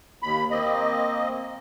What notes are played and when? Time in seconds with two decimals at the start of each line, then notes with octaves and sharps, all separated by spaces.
0.23 D#2 B5
0.51 A#3 C4 D#5